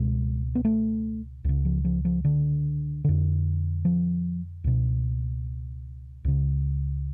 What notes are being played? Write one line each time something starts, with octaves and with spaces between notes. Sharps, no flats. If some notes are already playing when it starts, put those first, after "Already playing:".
Already playing: C#2 B2 G#3
B3
A3
C#2 C#3
F3
F3
F3
D3
F2 D3
F3
C#2 B2
C#2 C#3